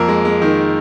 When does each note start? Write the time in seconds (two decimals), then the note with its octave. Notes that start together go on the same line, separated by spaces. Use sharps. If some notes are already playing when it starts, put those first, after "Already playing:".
Already playing: F2 A#3 A#4
0.08 G#3
0.25 G#3
0.42 D#3